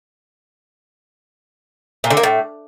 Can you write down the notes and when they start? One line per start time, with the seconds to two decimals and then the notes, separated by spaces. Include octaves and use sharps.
2.04 A#2
2.10 D3
2.17 A#3
2.23 A2